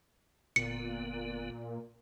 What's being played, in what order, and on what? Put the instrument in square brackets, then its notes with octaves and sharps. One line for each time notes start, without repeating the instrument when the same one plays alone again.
[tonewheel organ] G1 D3 B3 [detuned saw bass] A#2 [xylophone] C#7